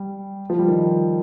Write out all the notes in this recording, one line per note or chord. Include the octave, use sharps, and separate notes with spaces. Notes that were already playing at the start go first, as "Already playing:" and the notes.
Already playing: G3
F3
G3
D#3